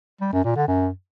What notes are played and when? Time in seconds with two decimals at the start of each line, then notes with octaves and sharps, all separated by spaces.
0.21 G3
0.33 F#2
0.44 A#2
0.56 D3
0.68 F#2